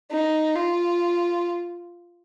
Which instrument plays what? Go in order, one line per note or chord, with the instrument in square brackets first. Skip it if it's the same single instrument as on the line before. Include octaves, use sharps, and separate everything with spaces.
[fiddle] D#4
F4